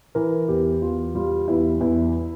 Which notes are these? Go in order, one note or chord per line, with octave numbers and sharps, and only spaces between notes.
E3 A#4
E2 G4
E2 F4
G3 F4
E2 E4
E2 E4